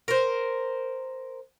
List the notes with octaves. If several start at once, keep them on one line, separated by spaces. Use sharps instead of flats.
A#4 C5